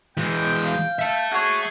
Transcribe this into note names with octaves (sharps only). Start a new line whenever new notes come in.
E3 G#3 G5
F5
E5 A5
F#4 G#4 C#5